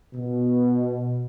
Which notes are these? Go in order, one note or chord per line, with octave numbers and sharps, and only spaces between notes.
B2